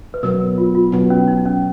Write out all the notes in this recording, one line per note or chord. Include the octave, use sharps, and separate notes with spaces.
B4
B2 F#3 B3 A#4
A#4
F4
F4
B2 F#3 B3 D#4
C#4
D#4
C#4